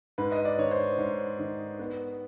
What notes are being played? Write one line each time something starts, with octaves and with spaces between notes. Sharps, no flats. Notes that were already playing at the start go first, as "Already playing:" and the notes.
G#2 B4
D#5
D5
D#3 C#5
C5
G#2 C#5
D#3
B3